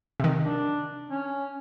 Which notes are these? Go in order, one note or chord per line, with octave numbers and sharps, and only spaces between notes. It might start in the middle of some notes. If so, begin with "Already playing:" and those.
C3 D#3
D4
C#4